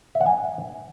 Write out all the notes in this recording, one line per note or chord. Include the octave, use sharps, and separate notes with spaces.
E5
F#5
G#5